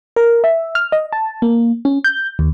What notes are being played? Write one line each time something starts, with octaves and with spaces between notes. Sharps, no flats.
A#4
E5
F6
D#5
A5
A#3
C#4
G6
D#2